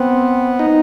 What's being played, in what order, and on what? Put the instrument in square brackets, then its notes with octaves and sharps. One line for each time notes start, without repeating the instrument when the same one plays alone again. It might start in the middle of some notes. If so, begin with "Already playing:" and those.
Already playing: [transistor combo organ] B3 [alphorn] C4
[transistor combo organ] D#4